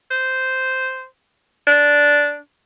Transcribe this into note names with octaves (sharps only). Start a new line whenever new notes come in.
C5
D4